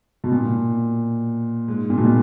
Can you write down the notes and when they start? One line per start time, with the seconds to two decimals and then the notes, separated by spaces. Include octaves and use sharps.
0.24 B2
0.32 A#2
1.68 G#2
1.90 A#2
1.98 B2
2.05 A#2